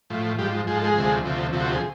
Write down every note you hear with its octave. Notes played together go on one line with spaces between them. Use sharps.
A2 F3
G#2 F3 G3 G4
G#2 F3 G#4
A4
G#3 G#4
D2 C3 F3
D2 C3 F3
D2 C3 F3
F#4
G4
G#4